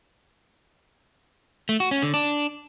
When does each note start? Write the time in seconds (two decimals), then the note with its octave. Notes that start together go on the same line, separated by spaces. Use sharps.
1.69 A3
1.80 F#4
1.91 C#4
2.03 D3
2.14 D4